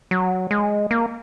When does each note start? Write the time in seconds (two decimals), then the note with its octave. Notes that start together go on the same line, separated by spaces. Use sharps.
0.11 F#3
0.51 G#3
0.91 A#3